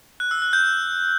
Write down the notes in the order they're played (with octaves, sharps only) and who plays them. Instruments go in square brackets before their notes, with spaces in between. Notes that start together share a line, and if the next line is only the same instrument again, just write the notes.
[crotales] F#6
E6
F#6
G6